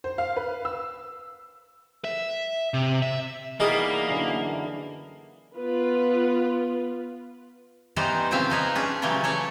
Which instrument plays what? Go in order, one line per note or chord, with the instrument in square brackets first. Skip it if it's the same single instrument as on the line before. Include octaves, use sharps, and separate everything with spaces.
[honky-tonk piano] C5
F5
B4
E6
[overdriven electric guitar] E5
C3
E5
[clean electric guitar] E3 G3 B3 [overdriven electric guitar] A#3 [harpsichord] D#4 G#4
[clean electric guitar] F#2 D3 E3
[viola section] B3 F4 B4
[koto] D#3 E3 G3 B3 D#4 C5
A#2 C#3 C4 E5 F5
F3 D#4 G#4 B4
C#4 D4 G#4
A#2 C#3 E3 F#3 G3 A3
A4 C#5 D5